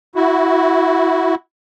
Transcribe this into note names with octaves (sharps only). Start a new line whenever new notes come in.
E4 F#4